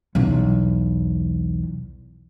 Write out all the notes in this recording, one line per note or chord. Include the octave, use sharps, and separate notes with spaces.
B1 E2